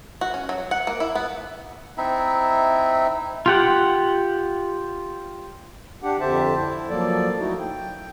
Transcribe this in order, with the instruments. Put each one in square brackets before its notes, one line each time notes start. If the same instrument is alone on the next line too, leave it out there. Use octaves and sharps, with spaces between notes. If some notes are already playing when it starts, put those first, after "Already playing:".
[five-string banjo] F#4
C#4
F#3
F#5
A#3
E4
B3
[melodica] C4 D#4 E4 E5
[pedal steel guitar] F4 G4 F#5
[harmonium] D4 G4 F#5
F2 D3 G4 C5 E5 A5
E4
F3 F#3 A#3 A4 D5
F#3 A3 D#4 E4 F#4
G5